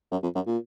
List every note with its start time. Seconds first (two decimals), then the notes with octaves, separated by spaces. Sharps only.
0.11 F#2
0.23 F2
0.35 F#2
0.47 A#2